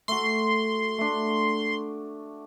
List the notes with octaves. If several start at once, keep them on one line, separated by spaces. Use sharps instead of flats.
A3 F#4 C6
A3 D4